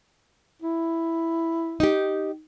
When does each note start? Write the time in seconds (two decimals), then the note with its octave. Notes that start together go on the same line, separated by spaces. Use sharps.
0.62 E4
1.80 D#4 G4